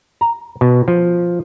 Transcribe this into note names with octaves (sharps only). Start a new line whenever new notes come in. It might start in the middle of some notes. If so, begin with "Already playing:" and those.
A#5
B2
F3